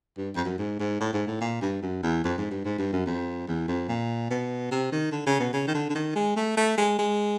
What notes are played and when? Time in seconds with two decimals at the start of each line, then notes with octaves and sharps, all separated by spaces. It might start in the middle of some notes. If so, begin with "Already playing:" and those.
0.17 G2
0.35 F2
0.45 F#2
0.58 G#2
0.79 G#2
1.00 A2
1.13 G#2
1.27 A2
1.41 A#2
1.62 G2
1.82 F#2
2.03 E2
2.24 F2
2.38 G#2
2.51 G2
2.65 G#2
2.78 G2
2.93 F#2
3.06 F2
3.48 E2
3.68 F2
3.89 A#2
4.30 B2
4.71 C3
4.92 D#3
5.12 D3
5.27 C#3
5.40 B2
5.53 C#3
5.67 D#3
5.74 D3
5.90 D3
5.95 D#3
6.16 G#3
6.36 A3
6.57 A3
6.78 G#3
6.98 G#3